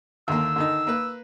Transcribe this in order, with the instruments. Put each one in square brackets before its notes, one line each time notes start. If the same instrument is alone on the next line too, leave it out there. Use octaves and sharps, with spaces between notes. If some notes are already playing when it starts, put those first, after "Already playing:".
[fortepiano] D#2 D3 A#3 [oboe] E6
[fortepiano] D3 D#3 D#4
A#3 B4